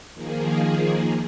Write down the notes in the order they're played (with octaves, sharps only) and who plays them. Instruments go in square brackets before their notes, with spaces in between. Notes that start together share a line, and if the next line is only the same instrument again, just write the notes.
[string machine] D#3 F3 A#3 G#4